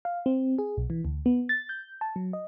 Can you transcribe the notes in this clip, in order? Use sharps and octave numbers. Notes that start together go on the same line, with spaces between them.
F5
C4
G#4
B1
E3
D2
B3
A6
G6
A5
F#3
D#5